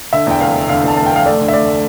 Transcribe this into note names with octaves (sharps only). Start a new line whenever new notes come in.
D3 E5
E2 G5
F1 F5
F1
D3 F5
E2 A5
F1 A5
G5
F1 F5
A3 D5
D3
E5
D2 D5